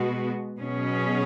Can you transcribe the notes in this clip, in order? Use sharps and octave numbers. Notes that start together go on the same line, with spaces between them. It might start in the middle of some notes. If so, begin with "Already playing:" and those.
Already playing: B2 G#3 B3 F#4
B2 F#3 C#4 G#4